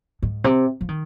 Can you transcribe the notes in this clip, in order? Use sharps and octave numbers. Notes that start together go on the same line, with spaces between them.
G#2
C3
F3
D#3